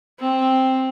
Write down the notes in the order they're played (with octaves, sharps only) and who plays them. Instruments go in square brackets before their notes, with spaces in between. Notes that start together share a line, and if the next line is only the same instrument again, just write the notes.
[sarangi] C4